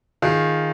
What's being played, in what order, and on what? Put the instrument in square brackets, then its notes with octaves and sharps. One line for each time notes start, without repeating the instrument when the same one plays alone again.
[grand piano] D#3 F4 G#4